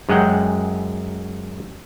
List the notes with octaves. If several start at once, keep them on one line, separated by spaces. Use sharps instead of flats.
F#2 G#3 G#4 F#5 G5